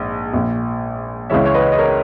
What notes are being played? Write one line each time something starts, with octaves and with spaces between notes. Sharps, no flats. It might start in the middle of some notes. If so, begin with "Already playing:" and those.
Already playing: A#1 G#2
A#1 A#2
C#2 C#3 E3 C#5 E5
C#5
B4 D#5
D#5
A#4 C#5